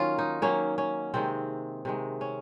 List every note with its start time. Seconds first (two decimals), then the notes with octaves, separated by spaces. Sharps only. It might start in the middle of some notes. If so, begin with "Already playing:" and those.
Already playing: D#3 F#3 A#3 C#4 F4
0.19 D#4
0.42 D#3 F#3 A#3 C#4
0.78 C#4
1.14 C3 D#3 G#3 C4
1.85 C3 D#3 G#3
2.21 C#4